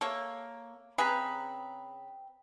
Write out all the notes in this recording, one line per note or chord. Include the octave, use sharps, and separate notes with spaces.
A#3 A4 C#5
C#3 C4 G#4 B4 A#5 B5